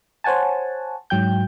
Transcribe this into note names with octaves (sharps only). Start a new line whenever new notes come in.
C5 C#5 F#5 G#5 A5
G#2 F#3 G5 G6